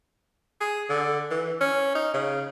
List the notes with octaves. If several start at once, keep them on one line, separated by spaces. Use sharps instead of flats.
G#4
D3
E3
C#4
D#4
C#3